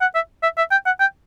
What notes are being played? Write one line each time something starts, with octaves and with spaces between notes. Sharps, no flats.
F#5
E5
E5
E5
G5
F#5
G5